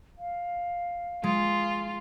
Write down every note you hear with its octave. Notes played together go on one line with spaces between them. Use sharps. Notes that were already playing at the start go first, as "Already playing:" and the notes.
F5
G#3 F4